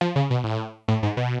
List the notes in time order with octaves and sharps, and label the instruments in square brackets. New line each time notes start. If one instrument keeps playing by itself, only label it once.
[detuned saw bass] F3
C#3
B2
A2
A2
G#2
B2